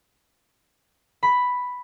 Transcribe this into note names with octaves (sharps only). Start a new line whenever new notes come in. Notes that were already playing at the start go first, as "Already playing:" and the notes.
B5